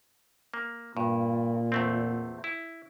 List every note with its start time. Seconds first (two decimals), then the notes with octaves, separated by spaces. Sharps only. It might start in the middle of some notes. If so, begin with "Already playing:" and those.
0.54 A#3
0.97 G2 A#2
1.72 E2 A3 C4
2.44 E4